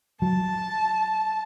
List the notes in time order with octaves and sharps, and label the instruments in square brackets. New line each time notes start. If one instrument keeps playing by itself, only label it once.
[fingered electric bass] F#3 [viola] A5